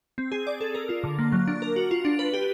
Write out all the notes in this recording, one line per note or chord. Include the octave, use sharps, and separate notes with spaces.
C4
G#4
D5
A4
A#4
F4
D3
A#3
F#3
D4
A#4
F#4
F4
D4
B4
G4